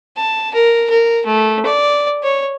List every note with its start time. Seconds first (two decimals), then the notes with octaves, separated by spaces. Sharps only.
0.17 A5
0.54 A#4
0.90 A#4
1.26 A3
1.65 D5
2.23 C#5